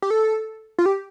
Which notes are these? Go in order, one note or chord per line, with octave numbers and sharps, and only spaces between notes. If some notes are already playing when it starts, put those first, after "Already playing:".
G4
A4
F4
G4